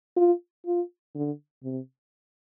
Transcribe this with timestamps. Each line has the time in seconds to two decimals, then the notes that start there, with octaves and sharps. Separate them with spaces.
0.16 F4
0.66 F4
1.15 D3
1.64 C3